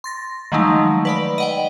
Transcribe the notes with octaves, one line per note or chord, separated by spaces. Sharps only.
C6 A6 A#6
D#3 F3 F#3 G#3 A3 D#4
B4 D5 B5
D#5 F#5 G5